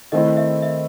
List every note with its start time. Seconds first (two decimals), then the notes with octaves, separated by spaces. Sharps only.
0.12 D#3 A3 C4 E4 D#5
0.37 E5
0.62 E5